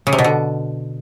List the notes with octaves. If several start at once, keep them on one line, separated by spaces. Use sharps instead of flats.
C#3
C3
B2
D3